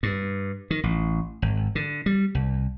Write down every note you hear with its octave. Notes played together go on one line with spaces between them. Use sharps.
G2
D#3
A1
G#1
D3
G3
C2